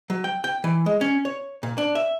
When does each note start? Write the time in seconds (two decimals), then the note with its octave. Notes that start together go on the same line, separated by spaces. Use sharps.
0.10 F#3
0.24 G5
0.44 G5
0.64 E3
0.86 G#3
1.01 C#4
1.25 C#5
1.63 A#2
1.78 D4
1.95 E5